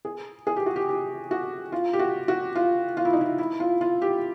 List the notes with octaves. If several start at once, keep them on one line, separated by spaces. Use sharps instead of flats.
G#4
G#4
G4
F#4
G4
G4
F#4
F4
G4
F#4
F#4
F4
F4
E4
D#4
E4
E4
F4
F4
G4